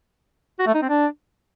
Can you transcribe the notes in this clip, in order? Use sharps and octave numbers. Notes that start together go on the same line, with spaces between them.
F#4
A3
D#4
C4
D4